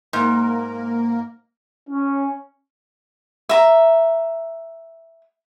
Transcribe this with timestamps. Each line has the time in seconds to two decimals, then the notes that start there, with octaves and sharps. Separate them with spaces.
0.13 G#2 A#3 A#4
1.90 C#4
3.49 E5 A#5